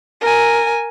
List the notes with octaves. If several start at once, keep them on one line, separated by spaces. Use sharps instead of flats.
A#4 G#5